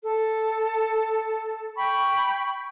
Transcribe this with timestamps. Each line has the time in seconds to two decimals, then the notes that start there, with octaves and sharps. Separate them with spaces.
0.03 A4
1.77 G5 B5 C#6